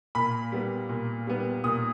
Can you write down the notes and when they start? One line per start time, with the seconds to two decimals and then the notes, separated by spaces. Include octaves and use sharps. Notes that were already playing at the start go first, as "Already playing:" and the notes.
0.15 A#2 B5
0.52 G3 B3
0.89 A#2
1.27 G3 B3
1.64 A#2 D#6